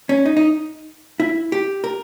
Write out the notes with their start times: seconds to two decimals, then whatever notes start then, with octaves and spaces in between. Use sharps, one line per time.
0.09 C#4
0.26 D#4
0.37 D#4
1.20 E4
1.52 G4
1.84 A#4